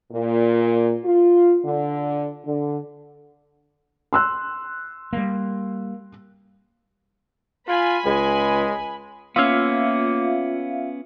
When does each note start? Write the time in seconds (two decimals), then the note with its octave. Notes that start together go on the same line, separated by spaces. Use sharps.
0.12 A#2
1.04 F4
1.64 D3
2.45 D3
4.13 C6 E6 F#6
5.13 G3 A3 A#3
7.68 F4 G#5 B5
8.06 C#2 G#3
9.36 A#3 B3 C#4 F4 E5 F5